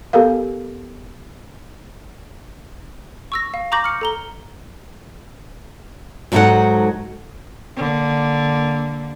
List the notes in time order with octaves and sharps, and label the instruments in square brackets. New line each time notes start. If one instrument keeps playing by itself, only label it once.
[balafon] B3 G4 A4 A#4 F5
[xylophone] C#6 E6 A#6
F5
A#5 C#6 D6 G6 A#6 F#7
F6 C#7
A4 A#5 G7
[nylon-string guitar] G#2 F#3 A3 D#4 A4 F#5
[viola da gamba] D3 A#3